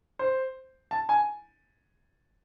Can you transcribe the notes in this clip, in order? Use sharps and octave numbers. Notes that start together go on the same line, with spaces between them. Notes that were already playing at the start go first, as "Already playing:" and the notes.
C5
A5
G#5